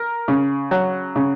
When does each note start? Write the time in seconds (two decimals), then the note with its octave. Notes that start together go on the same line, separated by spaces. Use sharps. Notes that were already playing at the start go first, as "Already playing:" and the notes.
Already playing: A#4
0.28 C#3
0.71 F#3
1.16 C#3